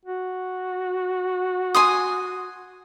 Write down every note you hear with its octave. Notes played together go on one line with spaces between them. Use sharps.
F#4
G#5 C6 D#6